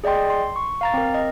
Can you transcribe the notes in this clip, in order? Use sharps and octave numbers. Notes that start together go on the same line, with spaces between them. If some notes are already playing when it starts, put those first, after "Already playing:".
G#4 D5 D#5 G5 C6
C6
C#6
F5 A#5 A6
C4 A#4
D#5